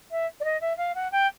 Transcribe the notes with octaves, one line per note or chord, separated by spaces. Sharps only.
E5
D5
D#5
E5
F5
F#5
G5